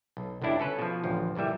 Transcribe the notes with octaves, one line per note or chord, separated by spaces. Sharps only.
B1
G1 C#2 B2 D4 E4 G4
C#4 A4 B4
B2 F3
A1 D2 F3
G1 A#2 E3 G3 E5